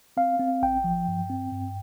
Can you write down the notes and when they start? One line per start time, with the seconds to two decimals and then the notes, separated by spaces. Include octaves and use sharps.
0.17 C4 F5
0.39 C4
0.62 A1 G5
0.84 F3
1.08 G2
1.30 C4
1.52 G2